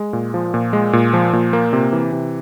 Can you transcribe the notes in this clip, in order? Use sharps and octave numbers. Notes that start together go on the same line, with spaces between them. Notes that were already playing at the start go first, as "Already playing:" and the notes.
Already playing: G#3
A#2
F3
A#2
G#3
A#2
F3
A#2
A#3
C3
E3
C3